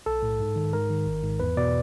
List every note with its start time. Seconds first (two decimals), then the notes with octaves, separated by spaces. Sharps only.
0.06 B1 A4
0.23 A2
0.40 G#2
0.56 D#3
0.73 G#2 A#4
0.90 D#3
1.06 G#1
1.23 G#2
1.40 E2 B4
1.57 B2 D5